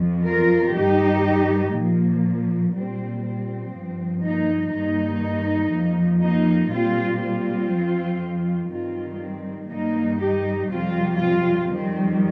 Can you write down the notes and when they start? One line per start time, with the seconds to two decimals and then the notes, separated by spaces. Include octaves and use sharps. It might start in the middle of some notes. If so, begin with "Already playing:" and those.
Already playing: F2 F3
0.25 F4 A#4
0.75 G2 D#3 G3 D#4 G4
1.74 A#2 F3 A#3
2.74 A#2 G3 C4
3.23 C4
3.74 G2 F3
4.23 A#3 D#4
4.73 G2 D#3 G3 A#3 D#4
5.72 F2 F3
6.22 A#3 D#4
6.71 A#2 G3 C4 F4
7.21 C4 F4
7.71 F2 F3
8.71 G2 D#3 G3 C4 F4
9.20 C4
9.70 G2 D#3 G3 A#3 D#4
10.20 D#4 G4
10.69 F2 C3 G3 C4 F4
11.19 C4 F4
11.69 F2 D#3 G3 C4